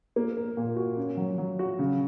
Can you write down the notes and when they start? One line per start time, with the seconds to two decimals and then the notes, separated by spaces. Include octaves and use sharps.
0.16 A#3
0.37 A#4
0.57 A#2
0.76 F#4
0.97 C#4
1.17 F#3
1.38 F#3
1.59 F#4
1.79 C#3